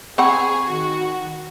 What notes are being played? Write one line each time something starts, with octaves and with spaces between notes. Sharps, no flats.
C4 G#4 F#5 G5 B5 C#6
D#3 F#4